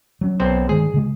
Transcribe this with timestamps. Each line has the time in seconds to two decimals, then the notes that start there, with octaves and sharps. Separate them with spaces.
0.21 F#3 C#4
0.40 B1 C4 C5
0.69 G2 D#3 G#3 G#4
0.94 C#3 G#3